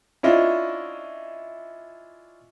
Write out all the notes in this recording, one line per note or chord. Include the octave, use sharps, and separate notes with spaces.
C#4 D4 E4 F4 D#5 E5